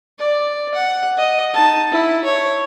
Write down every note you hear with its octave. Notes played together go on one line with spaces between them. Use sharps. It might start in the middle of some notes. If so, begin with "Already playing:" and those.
D5
F#5
D#5
D#4 A5
E4
C#5